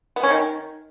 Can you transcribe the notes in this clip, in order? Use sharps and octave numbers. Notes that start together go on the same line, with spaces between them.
B3
C#4
D#3